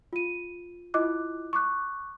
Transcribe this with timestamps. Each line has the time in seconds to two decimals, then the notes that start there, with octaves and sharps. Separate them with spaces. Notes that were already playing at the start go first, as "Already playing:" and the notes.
0.13 F4 D#7
0.94 E4 F4 D#5 D6 F#6
1.53 C#6 D6 F#6